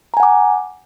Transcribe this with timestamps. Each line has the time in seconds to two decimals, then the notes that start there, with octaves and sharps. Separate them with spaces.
0.14 A#5
0.17 G#5
0.20 F#5
0.23 D6